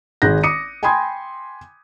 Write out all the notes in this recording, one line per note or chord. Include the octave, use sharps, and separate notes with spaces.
G#1 D#3 G#4 F#6 G6 A#6
D6 D#6 C#7 D#7
G5 G#5 B5 C6 D#6 G#6